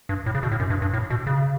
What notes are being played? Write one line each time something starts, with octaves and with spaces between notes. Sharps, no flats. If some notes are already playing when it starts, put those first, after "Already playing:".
G2
A2
C#3
B2
A2
F#2
G2
G2
A2
B2
C#3